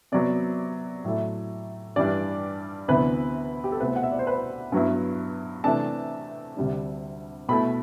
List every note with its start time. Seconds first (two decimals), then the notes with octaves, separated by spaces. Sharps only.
0.12 C3 F#3 B3 D5
1.04 A2 F#3 A3 E4
1.96 G2 E3 G3 D4 D5
2.88 D2 C3 E3 B3 E4 B4
3.64 G4
3.72 A4
3.80 C2 B2 A3 C4 E4 B4
3.96 F#5
4.03 E5
4.12 D5
4.19 C5
4.27 B4
4.72 G2 F#3 B3 E4
5.64 C3 E3 A3 D4 A5
6.57 D2 C3 G3 D4
7.49 B2 A3 E4 B5